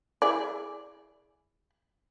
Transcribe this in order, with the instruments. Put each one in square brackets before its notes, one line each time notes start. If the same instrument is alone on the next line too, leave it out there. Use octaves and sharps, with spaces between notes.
[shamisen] E4 G#4 D5